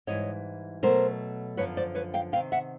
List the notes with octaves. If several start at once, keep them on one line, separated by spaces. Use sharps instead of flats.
G#2 E3 G3 C#5 D#5
B2 F#3 A3 A#4 C5
F#2 D3 F3 B4 C#5
C5 D5
B4 C#5
F5 G5
F2 C3 D#3 F5 G5
E5 F#5